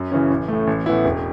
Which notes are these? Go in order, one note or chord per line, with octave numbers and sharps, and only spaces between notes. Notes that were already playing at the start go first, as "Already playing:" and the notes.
Already playing: F#2
C#3 E3 C#4
A1
A2 A3
A1
A2 E3 B3 E4
E1